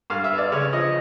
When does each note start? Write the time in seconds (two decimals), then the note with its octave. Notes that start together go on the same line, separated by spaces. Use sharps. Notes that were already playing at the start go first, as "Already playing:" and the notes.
0.10 G2 F5
0.24 E5
0.31 B3
0.38 D5
0.52 C#3 C#5
0.73 F3 D#5